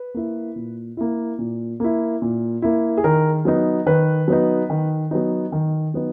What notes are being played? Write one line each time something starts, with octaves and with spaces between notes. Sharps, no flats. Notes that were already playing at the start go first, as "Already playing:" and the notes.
Already playing: B4
A#3 E4
A#2
A#3 E4
A#2
A#3 E4
A#2
A#3 E4
G#4
D#3 A#4
F#3 B3 D#4
D#3 B4
F#3 B3 D#4
D#3
F#3 B3 D#4
D#3
F#3 B3 D#4